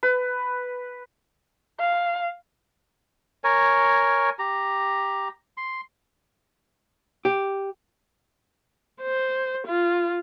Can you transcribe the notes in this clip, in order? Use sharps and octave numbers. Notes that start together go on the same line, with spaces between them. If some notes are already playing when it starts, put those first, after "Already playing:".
B4
F5
A#4 C#5 G#5
G4 A#5
C6
G4
C5
F4